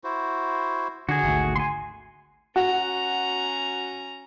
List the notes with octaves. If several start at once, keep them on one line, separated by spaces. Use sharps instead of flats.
E4 F#4 C5
D3 F#4 G#4
G#1 D2 A3
G#5 C6
C#4 F#4 A#5